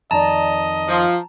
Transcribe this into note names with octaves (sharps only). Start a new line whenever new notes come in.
F2 D#3 D5 D#5 A5 A#5
F3